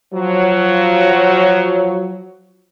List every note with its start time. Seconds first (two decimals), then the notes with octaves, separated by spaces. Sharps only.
0.13 F3 F#3